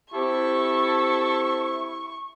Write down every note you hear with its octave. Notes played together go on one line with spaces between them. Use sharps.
C4 E4 G4 A4 C#6